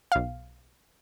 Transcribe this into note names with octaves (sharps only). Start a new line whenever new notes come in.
B1 F5